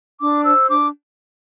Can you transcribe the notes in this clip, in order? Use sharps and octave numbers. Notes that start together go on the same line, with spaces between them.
D4 D6
C5 E6
D4 D6